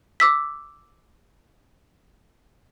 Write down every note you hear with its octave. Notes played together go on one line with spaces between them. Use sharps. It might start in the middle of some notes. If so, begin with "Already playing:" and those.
D6 E6 B6